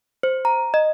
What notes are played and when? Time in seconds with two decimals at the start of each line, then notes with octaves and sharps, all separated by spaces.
0.23 C5
0.45 A#5
0.74 D#5